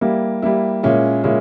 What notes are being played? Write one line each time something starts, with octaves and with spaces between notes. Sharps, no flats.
G3 A#3 E4
G3 A#3 E4
A#2 G#3 C#4 E4
A#2 G#3 C#4 E4